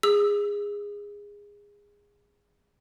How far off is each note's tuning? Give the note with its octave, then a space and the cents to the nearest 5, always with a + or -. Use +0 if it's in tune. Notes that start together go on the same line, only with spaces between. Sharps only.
G#4 -20 E6 +0